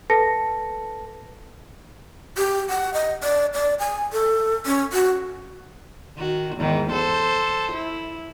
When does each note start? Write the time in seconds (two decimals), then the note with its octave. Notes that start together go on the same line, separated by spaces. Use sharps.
0.10 A4 B4 A5 A#6 C#7
2.37 G4
2.70 F#5
2.94 D#5
3.23 D5
3.54 D5
3.79 G#5
4.12 A4
4.66 C#4
4.93 F#4
6.18 D#3 F#4
6.56 E2 G#2 D#3
6.92 A4 C5
7.73 E4